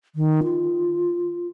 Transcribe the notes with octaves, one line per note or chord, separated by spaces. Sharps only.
D#3
F4